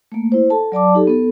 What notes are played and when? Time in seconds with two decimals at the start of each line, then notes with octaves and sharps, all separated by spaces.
0.12 A3 A#3
0.32 E4 C5
0.50 A4 A5
0.72 F#3 D5 A5 D6
0.95 D#4 G4 A4
1.07 B3 A4